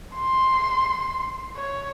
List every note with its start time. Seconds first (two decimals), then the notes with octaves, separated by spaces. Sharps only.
0.15 C6
1.56 C#5